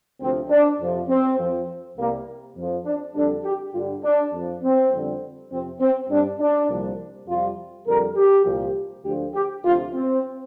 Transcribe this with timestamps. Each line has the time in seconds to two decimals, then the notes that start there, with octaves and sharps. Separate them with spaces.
0.21 D2 C3 F3 C4
0.49 D4
0.80 F2 C3 F3
1.08 C4
1.38 F2 F3
1.97 C2 C3 G3 A#3
2.57 F2 F3
2.85 D4
3.15 F2 D3 G3 D4
3.44 G4
3.74 G2 D3 G3 F4
4.04 D4
4.33 F2
4.38 F3
4.63 C4
4.92 F2 D3 G3
5.51 F2 C3 F3 C4
5.80 C4
6.10 G2 G3 D4
6.40 D4
6.69 C2 A#2 F3
7.28 F2 C3 G3 F4
7.87 F2 D3 G3 A#4
8.16 G4
8.46 C2 A#2 F3
9.05 D2 D3 F3 G4
9.34 G4
9.64 D2 C3 F3 F4
9.93 C4